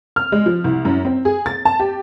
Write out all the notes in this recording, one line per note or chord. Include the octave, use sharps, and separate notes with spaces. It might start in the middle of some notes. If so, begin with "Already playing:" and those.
F6
G#3
F3
C2
F#2
C4
G#4
A6
A5
G4